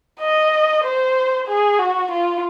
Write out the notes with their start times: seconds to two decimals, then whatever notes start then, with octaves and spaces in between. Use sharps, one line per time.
0.20 D#5
0.84 C5
1.47 G#4
1.79 F#4
2.11 F4